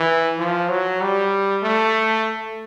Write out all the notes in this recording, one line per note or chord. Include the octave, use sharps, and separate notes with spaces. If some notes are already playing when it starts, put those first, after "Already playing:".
Already playing: E3
F3
F#3
G3
A3